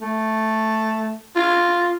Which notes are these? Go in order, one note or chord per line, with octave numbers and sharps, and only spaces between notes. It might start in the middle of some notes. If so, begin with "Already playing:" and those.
A3
F4